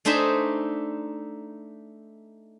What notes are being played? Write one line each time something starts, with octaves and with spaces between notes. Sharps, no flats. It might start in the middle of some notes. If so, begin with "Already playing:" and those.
A3 D4 D#4 C5 E5 G#5